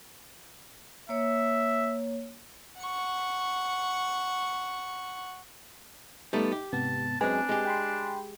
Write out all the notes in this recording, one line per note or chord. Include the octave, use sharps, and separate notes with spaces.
A#3 C#5 E5
F#5 C#6
G3 A3 B3 D#4
G4
G#2 C3 B3 A5
F#2 G#3 C4 D4 B4 G#5
G#3 G4
G5 B5 C6